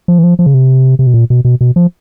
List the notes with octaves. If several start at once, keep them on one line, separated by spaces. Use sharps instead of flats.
F3
E3
F3
F3
C#3
C3
C3
B2
A#2
B2
B2
B2
F3